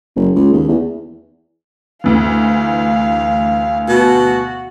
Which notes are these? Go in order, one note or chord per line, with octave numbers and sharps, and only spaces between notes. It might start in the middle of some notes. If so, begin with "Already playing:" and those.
F#1
C#2
D#2
E2
D2 E3 F5
B2 F#4